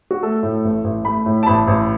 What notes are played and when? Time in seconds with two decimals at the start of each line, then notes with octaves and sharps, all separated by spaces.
0.11 F#4
0.23 A3 A4
0.43 A2
0.65 A1
0.84 A1
1.05 A3 B5
1.26 A2
1.43 A5
1.46 A1 B5
1.68 A1